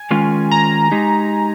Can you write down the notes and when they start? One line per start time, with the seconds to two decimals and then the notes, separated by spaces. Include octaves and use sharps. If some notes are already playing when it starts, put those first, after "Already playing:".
Already playing: G#5
0.11 D#3 G#3 C#4 F4
0.51 A#5
0.91 G#3 D#4 G4